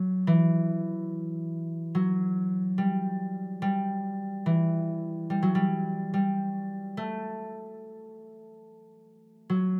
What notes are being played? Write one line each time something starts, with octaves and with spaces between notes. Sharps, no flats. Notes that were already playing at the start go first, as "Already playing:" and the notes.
Already playing: F#3
E3
F#3
G3
G3
E3
G3
F#3
G3
G3
A3
F#3